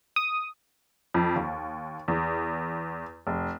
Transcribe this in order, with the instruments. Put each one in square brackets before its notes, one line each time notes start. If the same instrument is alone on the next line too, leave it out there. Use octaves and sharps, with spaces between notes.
[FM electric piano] D#6
[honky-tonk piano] F2
D#2
E2
F1